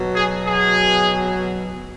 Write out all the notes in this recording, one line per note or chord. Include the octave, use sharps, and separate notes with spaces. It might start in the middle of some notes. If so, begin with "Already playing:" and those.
Already playing: B2 F#3
G#4
G#4